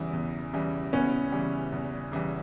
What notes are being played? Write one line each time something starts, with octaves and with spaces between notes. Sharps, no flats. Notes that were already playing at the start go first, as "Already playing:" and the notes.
Already playing: E2 C#3 E3 G3
E2
C#3 E3 G3
E2 B3 C#4
C#3 E3 G3
E2
C#3 E3 G3